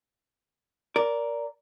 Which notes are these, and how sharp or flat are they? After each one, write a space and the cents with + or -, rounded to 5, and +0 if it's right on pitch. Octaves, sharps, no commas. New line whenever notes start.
A#4 +5 D5 -15